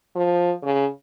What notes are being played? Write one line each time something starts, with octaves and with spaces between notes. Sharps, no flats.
F3
C#3